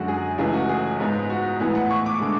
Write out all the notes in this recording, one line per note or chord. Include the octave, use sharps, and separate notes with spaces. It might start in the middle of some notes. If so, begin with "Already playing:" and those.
Already playing: F#2 D3 G#3 F#4
G#4
C#2 C#3 E3 A3 G#4
F#4
G#4
G#2 G#3 B3
F#4
A2 E3 G#3 B3 F#5
F#5
C#6
D6
D3 G#3